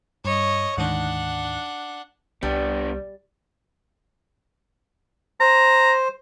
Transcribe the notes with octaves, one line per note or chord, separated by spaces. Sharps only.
G2 C#5 D#5
D2 G#2 D#3 D4 F#5
C2 G3 B3 D4
C5 A#5